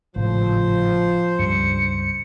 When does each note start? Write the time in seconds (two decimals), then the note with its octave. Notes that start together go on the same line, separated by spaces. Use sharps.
0.16 G#1 A2 C#3 F3 C5
1.39 C#2 G2 C#7